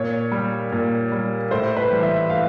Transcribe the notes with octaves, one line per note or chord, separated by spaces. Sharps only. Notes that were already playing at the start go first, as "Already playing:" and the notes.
Already playing: A#2 C#5
G3
A#2
G3
A2 C5
B4
E3 G3
E5
A2 F5